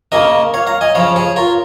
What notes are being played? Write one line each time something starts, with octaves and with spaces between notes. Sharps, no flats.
C#3 A#3 C#4 A#4 D#5
C#5 F5
F5 A#5
D#5 G#5
C#3 F3 C#4 C#5 F5
G#4 C#5
F4 A#4